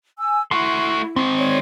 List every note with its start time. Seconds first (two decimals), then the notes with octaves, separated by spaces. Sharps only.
0.18 G#5 E6
0.51 A3 E4 F#4 C6
1.16 D#3 G#3 C4
1.39 C#5 D5